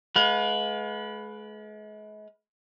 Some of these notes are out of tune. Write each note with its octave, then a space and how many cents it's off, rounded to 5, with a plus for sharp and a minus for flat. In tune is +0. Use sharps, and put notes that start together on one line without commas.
G#3 +40 B4 +0 F5 +40